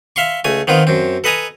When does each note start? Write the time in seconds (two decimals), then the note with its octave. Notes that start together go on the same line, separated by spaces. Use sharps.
0.16 E5 F5 C6 C#6
0.44 C#2 A3 G#5
0.67 D#3 B3 C4 F4
0.87 F#2 C4
1.24 A4 B4 D#5 G#5 A#5